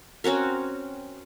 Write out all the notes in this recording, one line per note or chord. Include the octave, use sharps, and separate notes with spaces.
C4 C#4 F#4 A#4